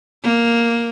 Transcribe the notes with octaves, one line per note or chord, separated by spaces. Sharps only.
A#3